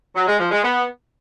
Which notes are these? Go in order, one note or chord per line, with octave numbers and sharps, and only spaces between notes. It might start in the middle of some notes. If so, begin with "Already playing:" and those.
F#3
G#3
F3
G#3
B3